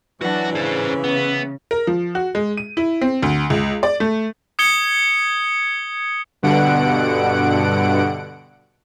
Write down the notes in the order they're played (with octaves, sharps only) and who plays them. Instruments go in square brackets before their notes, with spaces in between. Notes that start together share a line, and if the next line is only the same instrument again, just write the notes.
[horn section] E3 [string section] F#3 D4 [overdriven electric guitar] F#4 F#5
[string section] C#3 [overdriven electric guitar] G#4 C5
[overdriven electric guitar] B3
[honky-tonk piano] A#4
F3
F#4
G#3
D#7
E4
C4
D2
C#2
D5
A3
[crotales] D#6 G#6 C#7 G7
[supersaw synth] G2 B2 D3 F#5 D7